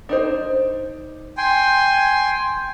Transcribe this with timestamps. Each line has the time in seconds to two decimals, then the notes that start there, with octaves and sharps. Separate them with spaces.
0.09 D4 D#4 C5
1.37 G5 G#5 C6